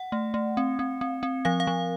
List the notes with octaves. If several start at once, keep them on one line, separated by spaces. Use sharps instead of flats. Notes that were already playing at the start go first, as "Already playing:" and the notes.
Already playing: F#5
A3
A3
C4
C4
C4
C4
F3 F5
F5
F3